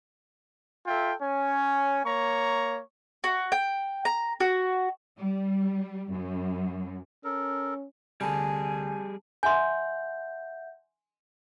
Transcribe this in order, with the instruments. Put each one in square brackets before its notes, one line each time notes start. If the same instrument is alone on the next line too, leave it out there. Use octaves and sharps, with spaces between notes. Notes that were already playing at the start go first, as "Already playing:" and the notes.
[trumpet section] F4 A4 E5 G5
C#4 C#5 G#5
A#3 C#5 A#5 C#6
[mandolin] F#4
G5
A#5
F#4
[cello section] G3
F#2
[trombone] C#4 [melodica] A4 A#4
[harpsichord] D2 C3 [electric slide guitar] G3 G#4 [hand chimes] C4 A5 B5 [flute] G#5
[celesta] E5 F#5 G6 [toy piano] G#5 C6